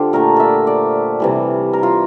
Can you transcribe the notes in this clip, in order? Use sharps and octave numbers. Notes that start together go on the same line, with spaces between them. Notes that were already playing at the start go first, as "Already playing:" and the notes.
Already playing: D3 F4 G4 C5
A#2 A3 A#4
D5 E5
D5
C3 E3 G3
A#4
F4